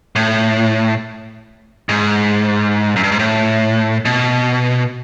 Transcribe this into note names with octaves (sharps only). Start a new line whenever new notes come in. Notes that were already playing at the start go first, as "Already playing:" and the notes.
A2
G#2
F#2
G2
G#2
A2
B2